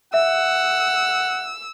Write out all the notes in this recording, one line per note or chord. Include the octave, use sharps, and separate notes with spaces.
E5 F#5 E6